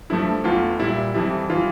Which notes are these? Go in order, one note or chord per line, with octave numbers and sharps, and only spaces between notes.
G2 F3 A3 E4
E2 E3 A3 F4
A#2 G3 E4
F2 E3 G3 E4
E3 G3 F4